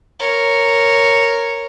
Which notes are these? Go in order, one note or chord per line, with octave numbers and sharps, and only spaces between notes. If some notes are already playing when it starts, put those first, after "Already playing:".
A#4 C#5